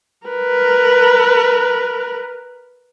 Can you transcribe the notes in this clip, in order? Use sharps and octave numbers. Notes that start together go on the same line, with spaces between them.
A#4 B4